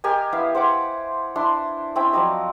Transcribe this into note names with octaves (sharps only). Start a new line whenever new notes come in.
G4 A#4 D#5 G#5
B3 E4 F5
C5 F#5 B5 D6
D4 E4 C6
C4 C#4 E4 G5
F3 F#3 D5 D#5